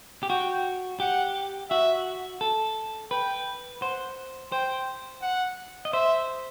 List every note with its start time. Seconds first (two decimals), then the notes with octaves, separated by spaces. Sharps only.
0.23 G4
0.30 F#4 G5
1.00 G4 F#5
1.70 F#4 E5
2.41 A4
3.11 B4 G5
3.81 C5 F#5
4.52 C5 G5
5.22 F#5
5.85 D#5
5.93 C5 E5